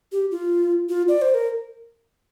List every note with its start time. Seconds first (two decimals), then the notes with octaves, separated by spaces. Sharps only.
0.12 G4
0.31 F4
0.89 F4
1.08 D5
1.22 C5
1.34 A#4